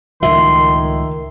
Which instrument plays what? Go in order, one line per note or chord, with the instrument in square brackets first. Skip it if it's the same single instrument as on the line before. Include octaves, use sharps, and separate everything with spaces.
[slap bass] C#2 A2 F3 [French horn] D#3 [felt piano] E5 [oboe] C6